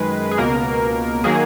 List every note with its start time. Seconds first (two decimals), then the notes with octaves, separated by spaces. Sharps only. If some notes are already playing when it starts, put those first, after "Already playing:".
Already playing: F#2 D#3 G#3 B4
0.31 G#4
0.38 C#2 B2 A#3 A#4
1.24 D#3 F#3 A#3 G#4